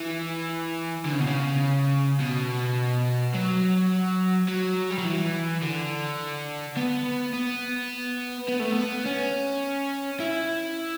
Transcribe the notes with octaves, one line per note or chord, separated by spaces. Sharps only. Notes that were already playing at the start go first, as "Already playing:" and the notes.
Already playing: E3
D3
C#3
B2
C#3
B2
F#3
F#3
G3
F#3
E3
D3
B3
B3
B3
A3
B3
C#4
E4